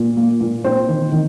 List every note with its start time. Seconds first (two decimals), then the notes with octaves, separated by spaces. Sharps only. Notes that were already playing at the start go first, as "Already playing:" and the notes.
Already playing: A#2
0.17 A#3
0.41 A#2
0.64 C4 C5
0.89 D#3
1.12 D#3